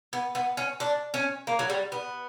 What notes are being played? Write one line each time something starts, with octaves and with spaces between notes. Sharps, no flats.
B3
B3
C#4
D4
C#4
A#3
F#3
G3
B3